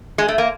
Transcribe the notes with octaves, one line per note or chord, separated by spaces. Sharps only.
G#3
A3
A#3